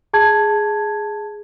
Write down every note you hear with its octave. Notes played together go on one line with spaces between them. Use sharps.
G#4 A5 G#6